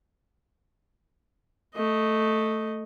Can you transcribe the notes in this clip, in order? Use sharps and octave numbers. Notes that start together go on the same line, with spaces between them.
A3 D#5